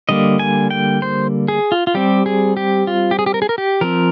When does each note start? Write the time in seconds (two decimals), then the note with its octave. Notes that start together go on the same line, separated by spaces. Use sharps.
0.09 D3 G3 A#3 D#5
0.39 G#5
0.71 G5
1.02 C5
1.48 G#4
1.72 F4
1.87 F4
1.95 G3 C4 G4
2.26 G#4
2.57 G4
2.87 F4
3.11 G4
3.19 G#4
3.26 G4
3.34 A#4
3.42 G#4
3.49 A#4
3.58 G4
3.81 F3 C4 A#4